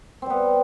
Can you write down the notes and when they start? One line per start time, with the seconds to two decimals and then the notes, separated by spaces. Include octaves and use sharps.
0.22 C4
0.26 G3
0.30 B3